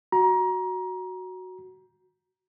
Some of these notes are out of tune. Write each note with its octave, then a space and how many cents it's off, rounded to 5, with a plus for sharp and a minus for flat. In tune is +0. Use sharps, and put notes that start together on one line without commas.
F#4 +0 A#5 +25